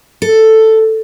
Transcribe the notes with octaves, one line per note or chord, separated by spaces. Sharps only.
A4